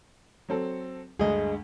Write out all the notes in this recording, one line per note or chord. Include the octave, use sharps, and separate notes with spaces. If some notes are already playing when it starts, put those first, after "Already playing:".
F#3 C4 A4
D2 G2 G#3 G#4 D#5